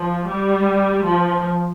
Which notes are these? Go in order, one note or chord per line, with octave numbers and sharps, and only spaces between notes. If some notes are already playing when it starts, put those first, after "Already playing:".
Already playing: F3
G3
F3